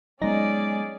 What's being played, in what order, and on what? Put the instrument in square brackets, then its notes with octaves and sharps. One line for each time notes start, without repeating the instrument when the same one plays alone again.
[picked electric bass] F#3 G#3 B3 [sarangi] C#4 [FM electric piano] D#4 A#6 [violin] G#4 D5